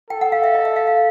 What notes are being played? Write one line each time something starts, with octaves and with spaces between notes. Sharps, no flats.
A4 G5
F#5
F5
E5
D#5
E5
F5
F5